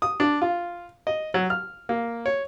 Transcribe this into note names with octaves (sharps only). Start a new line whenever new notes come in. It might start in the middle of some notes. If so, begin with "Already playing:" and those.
D#6
D4
F4
D#5
F#3
F6
A#3
C#5